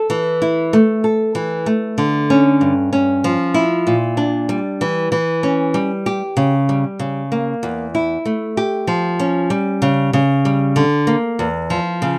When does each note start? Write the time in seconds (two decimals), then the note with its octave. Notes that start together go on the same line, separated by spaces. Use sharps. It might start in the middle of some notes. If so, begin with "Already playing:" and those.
Already playing: A4
0.10 E3
0.42 E4
0.73 A3
1.04 A4
1.35 E3
1.66 A3
1.98 D3
2.30 C#4
2.61 G2
2.93 C#4
3.24 F3
3.54 E4
3.87 A#2
4.17 D4
4.49 G3
4.81 E3
5.12 E3
5.43 C#4
5.74 G3
6.06 G4
6.37 C#3
6.69 G3
6.99 C#3
7.32 A#3
7.63 E2
7.95 E4
8.25 A3
8.57 G4
8.87 F3
9.20 C#4
9.50 G3
9.82 C#3
10.13 C#3
10.45 G3
10.76 D3
11.07 A#3
11.39 E2
11.70 F3
12.02 C#3